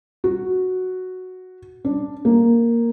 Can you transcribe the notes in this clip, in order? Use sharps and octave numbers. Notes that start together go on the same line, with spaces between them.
F#4
D4
A#3